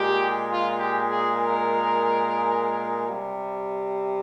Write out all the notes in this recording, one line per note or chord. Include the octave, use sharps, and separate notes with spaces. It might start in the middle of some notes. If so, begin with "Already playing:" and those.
Already playing: A#2 G#3 G4
F4
G4
G#4
A#4
C3 G3